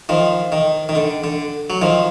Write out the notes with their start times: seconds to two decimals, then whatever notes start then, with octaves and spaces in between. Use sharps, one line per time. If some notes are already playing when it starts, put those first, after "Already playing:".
0.09 D#3 F3
0.52 D#3
0.89 D#3
0.95 D3
1.24 D3
1.70 F#3
1.82 D#3 F3